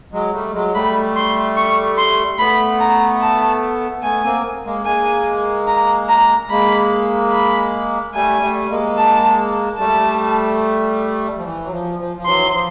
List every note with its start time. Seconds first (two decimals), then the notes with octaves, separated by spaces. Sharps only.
0.13 F#3 G#3
0.33 G3 A3
0.54 F#3 G#3
0.74 G3 A3 B5
1.16 C6
1.57 C#6
1.98 C6
2.38 A3 B3 B5
2.80 A#5
3.21 A5
4.03 A3 B3 G#5
4.24 A#3 C4
4.66 G#3 A#3
4.85 G#3 A#3 G#5
5.68 A#5
6.09 A#5
6.50 G#3 A#3 B5
7.32 B5
8.15 G3 A3 G#5
8.42 G3 A3
8.70 G#3 A#3
8.98 A5
9.79 G3 A3 A5
11.37 F3
11.44 E3
11.65 F#3
11.71 F3
11.99 F3
12.17 F3
12.26 E3 F#3 C6
12.53 F3